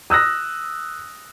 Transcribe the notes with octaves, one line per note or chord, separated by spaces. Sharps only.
D#6 E6 F#6 A#6